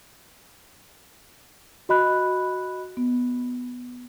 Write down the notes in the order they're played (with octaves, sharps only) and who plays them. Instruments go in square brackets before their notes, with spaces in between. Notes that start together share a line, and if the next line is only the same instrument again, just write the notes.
[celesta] F#4 D#5 B5 F#6
[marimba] B3